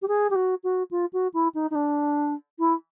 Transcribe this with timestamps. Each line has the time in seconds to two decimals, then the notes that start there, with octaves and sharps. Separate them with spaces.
0.02 G4
0.07 G#4
0.30 G4
0.35 F#4
0.63 F#4
0.91 F4
1.13 F#4
1.33 E4
1.54 D#4
1.70 D#4
1.75 D4
2.59 E4